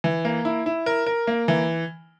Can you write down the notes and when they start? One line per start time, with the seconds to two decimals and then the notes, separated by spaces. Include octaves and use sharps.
0.04 E3
0.25 A#3
0.45 E4
0.66 E4
0.86 A#4
1.07 A#4
1.27 A#3
1.48 E3